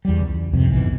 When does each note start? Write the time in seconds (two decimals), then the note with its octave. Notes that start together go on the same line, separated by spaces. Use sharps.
0.05 E2 G3
0.21 C#2
0.53 C2 F2 G#2 C3
0.70 B1 G#2 E3